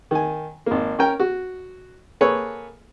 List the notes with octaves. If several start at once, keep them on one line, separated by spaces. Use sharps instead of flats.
D#3 G#5
G#1 A#3
C#4 A#4 G5
F#4
A#3 G#4 A4 B4 C#5